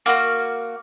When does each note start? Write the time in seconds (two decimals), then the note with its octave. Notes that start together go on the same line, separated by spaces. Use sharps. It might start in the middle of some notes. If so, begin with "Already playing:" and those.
0.06 A#3 F#4 C6 F6